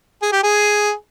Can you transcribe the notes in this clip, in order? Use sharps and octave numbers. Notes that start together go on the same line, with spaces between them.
G#4
G4
G#4